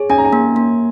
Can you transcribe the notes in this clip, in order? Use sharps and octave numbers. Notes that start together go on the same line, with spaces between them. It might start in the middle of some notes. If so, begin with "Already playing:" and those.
Already playing: G#4 C#5
C#4 G#5
A#5
G#5
A#3
A#3